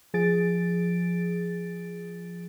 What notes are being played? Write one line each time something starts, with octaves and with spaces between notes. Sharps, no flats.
F3 G#4 A6 D7